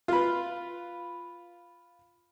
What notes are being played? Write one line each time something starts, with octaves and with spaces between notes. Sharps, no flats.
F4 B4